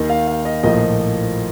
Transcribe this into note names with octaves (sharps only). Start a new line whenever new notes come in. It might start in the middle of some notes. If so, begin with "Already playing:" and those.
Already playing: D#2 D#3 A#3 D#4 D#5
F5
F5
D#5
A#1 A2 F3 A#3 D#5